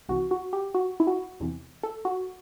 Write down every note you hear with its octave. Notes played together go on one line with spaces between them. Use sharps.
C2 C3 E3 F#4
F#4
G4
F#4
E4
F#4
E2 C3 E3
A4
F#4